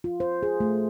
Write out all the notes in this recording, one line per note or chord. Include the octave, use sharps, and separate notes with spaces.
F4
C5
G#4
A3